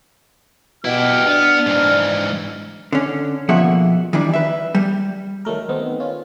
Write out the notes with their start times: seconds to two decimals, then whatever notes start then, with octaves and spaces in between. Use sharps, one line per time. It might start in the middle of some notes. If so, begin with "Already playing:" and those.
0.85 B2 E4 G4 F6
1.27 B3 D4
1.67 G#2 E3
2.92 D3 C#4
3.49 B2 F3 A#3 G#4 E5 F#5
4.13 D#3 E3 G3 D4
4.33 B4 E5
4.75 G3
5.45 D#3 F#3 A3 A#4
5.69 D#3 B3 C4
6.00 C#4 F4